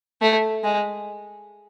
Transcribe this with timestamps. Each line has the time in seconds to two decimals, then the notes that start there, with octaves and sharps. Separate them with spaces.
0.21 A3
0.64 G#3